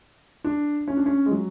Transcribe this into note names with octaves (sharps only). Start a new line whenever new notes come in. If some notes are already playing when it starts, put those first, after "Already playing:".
D4
C#4
D4
C#4
G#3
F#3